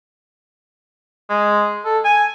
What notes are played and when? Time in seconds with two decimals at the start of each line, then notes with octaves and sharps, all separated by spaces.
1.30 G#3
1.85 A4
2.04 G#5